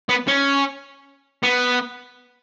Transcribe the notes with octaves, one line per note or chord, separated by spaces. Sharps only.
B3
C#4
B3